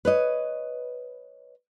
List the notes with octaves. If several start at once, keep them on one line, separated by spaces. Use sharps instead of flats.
B4 C#5 D#5